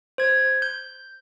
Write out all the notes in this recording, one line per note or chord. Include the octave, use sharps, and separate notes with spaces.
C5 G#6
G6